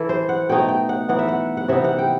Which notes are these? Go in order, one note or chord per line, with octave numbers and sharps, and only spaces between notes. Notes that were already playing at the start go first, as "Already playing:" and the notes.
Already playing: E3 E4 A4
C5
F#5
B2 A3 D#4 G5
G5
F#5
E3 B3 D#4 F#5
E5
F#5
F#5
C3 E3 B3 D#4 E5
F#5
G5